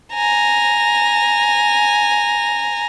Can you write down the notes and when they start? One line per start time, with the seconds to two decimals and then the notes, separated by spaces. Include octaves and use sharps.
0.14 G#5 A#5